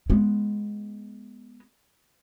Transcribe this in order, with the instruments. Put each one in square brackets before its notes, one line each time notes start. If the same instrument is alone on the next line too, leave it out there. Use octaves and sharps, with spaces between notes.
[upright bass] G#3 B3